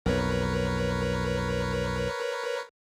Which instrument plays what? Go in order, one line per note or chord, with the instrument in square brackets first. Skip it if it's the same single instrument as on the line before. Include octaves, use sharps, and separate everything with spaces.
[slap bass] B1 F2 [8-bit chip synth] A#4 B4 C#5